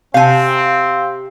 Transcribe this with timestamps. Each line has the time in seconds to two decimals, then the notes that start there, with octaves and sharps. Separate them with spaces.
0.14 C3 C4 F5 G#5